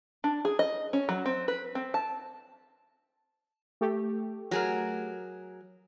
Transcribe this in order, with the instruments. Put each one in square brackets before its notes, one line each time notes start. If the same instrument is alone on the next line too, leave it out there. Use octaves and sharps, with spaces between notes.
[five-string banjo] D4
G#4
D#5
C#4
F#3
C4
B4
C4
A5
[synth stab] A3 G4
[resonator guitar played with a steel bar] F#3 G#4 A#4